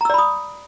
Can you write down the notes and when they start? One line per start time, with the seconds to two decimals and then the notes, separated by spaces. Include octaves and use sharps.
0.01 A#5
0.05 E6
0.10 D5
0.14 B5
0.18 D#6